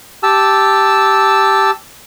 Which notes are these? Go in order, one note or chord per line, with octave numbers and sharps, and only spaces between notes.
G4 A5 E6